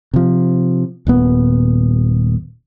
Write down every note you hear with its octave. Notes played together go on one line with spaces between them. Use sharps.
C3 F3
D#1 A#2 B3